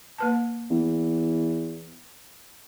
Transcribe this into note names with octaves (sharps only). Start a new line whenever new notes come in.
A#3 B4 A5
E2